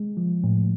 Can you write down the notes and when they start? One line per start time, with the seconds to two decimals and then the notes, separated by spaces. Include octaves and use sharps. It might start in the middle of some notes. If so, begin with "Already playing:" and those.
Already playing: G#3
0.17 F3
0.44 A2